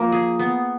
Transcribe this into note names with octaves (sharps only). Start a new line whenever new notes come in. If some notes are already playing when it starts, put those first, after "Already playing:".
Already playing: F3 A#3
G#4
B3